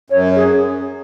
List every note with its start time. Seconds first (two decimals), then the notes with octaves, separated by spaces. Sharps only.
0.10 F#2 C#5
0.36 G#4